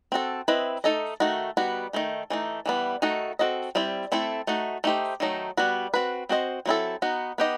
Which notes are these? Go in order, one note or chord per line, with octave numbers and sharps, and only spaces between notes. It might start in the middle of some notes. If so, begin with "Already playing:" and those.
C4 F#4 A4
C4 E4 B4 D#5
A3 D#4 A4 D#5
D#3 A3 D#4 F#4
D#3 G3 B3 F#4
D#3 A3 D#4
E3 A3 D#4
E3 G3 B3
D#3 A3 D#4 F#4 A4
C4 F#4 A4 D#5
G3 C4 E4
A3 C4 E4 A4
A3 D#4 F#4
A3 D#4 G4 C5
D#3 F#3 A3 D#4
G3 B3 F#4 B4
C4 F#4 B4
C4 F#4 C5 D#5
F#3 C4 E4 A4
B3 D#4 F#4
B3 D#4 G4 D#5